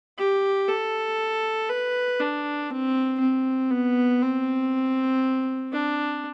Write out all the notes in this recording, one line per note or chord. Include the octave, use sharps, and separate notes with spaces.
G4
A4
B4
D4
C4
C4
B3
C4
D4